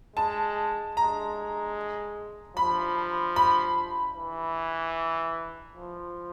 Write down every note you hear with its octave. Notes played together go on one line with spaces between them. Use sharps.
G#3 A5
G#3 A#5
F3 B5
B5
E3
F3